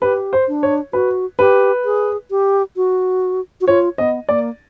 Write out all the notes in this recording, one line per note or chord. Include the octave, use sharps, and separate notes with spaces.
G4 B4
C5
D4
C#5
F#4 B4
G4 B4
G#4
G4
F#4
F#4
F4 C#5
B3 D#5
A#3 D5